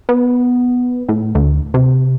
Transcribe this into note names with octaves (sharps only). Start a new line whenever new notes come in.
B3
A2
D2
C3